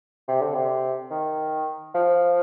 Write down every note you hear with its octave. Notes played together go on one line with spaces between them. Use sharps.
C3
D3
C3
D#3
F3